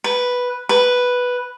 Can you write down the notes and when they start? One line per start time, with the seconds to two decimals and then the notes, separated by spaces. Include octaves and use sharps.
0.04 B4
0.69 B4